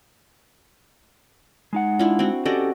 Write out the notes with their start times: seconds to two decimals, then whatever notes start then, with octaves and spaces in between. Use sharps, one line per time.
1.73 G#3 D#4 F#5
1.99 D4 E4 F4
2.19 C4 F#4
2.45 C#4 F#4 G4 A4 D5 D#5